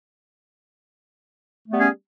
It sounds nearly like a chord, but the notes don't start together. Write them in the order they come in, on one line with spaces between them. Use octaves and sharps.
A3 B3 G3 C#4 G#4